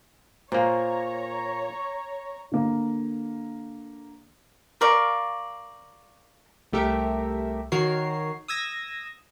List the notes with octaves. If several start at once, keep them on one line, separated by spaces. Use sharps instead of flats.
A#2 A#3 C5 C#5 A#5
D3 A#3
A#4 D5 F5 C#6
C2 A3 G4 A#4 E5
D#3 F#4 A#4 C#5 C7
D#6 E6 G#6 A#6